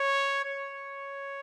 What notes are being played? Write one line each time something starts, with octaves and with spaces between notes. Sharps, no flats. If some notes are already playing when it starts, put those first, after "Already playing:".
Already playing: C#5
C#5